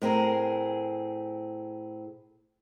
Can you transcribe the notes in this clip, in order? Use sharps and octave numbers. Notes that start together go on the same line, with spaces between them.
A2 C4 G#4 A#4